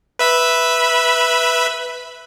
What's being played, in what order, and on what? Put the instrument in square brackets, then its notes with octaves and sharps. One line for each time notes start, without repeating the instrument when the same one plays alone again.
[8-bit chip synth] B4 E5 B5